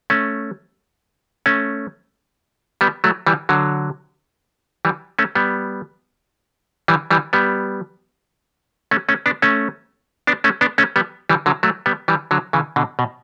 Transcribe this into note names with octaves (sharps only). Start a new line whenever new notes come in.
A3 C#4
A3 C#4
G3 B3
F#3 A3
E3 G3
D3 F#3
E3 G3
A3 C#4
G3 B3
E3 G3
E3 G3
G3 B3
A3 C#4
A3 C#4
B3 D4
A3 C#4
B3 D4
A3 C#4
B3 D4
A3 C#4
G3 B3
E3 G3
D3 F#3
F#3 A3
G3 B3
E3 G3
D3 F#3
C#3 E3
B2 D3
B2